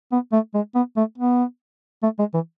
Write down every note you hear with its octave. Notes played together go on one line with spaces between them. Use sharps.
B3
A3
G#3
B3
A3
B3
A3
G#3
E3